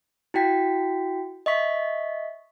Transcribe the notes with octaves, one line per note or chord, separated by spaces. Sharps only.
E4 F#4 G5 B6
D#5 E5 C#6 B6